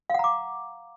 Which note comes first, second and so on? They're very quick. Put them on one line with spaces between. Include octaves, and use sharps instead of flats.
F5 F#5 A#5 D6